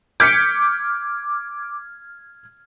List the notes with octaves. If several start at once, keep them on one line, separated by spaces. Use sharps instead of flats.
D6 F6 G6 G#6 B6 C#7